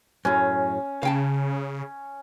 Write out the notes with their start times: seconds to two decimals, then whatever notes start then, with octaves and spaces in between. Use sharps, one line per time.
0.25 F#2 A2 C#4
1.03 C#3 F5 G5 A5